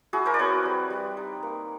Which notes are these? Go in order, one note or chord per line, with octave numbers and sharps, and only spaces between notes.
E4 F#4 G#4
A#4 C5
D5
C4 B4 C#5
G3
G3
D#4
A#3